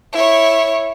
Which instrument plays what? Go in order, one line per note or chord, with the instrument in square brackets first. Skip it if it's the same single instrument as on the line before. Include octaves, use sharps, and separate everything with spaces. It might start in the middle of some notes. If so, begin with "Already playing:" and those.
[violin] E4 C#5